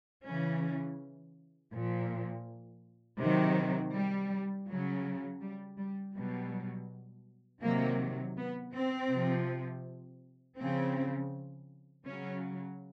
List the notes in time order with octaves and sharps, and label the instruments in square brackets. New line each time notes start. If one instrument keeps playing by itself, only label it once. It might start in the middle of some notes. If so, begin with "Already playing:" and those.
[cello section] C#3 E3 C#4
A#2 F3
C3 D#3 F#3
G3
C#3 F#3
G3
G3
B2 F#3 G3
C3 D#3 F#3 A#3
B3
C4
C3 F3
C#3 F3 C4
C#3 F#3 C#4